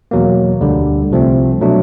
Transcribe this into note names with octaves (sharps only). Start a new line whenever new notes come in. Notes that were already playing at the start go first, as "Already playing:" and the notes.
E2 B2 F#3 A#3
D2 D3 G3
C2 C3 F3 A3 C4
B2 F#3 A3 D4